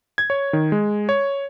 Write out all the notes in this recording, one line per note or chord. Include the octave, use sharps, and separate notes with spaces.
G#6
C#5
D#3
G#3
C#5